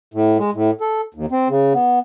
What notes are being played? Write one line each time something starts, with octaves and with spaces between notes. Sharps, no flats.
A2
G#3
A2
A4
D#2
C4
C#3
B3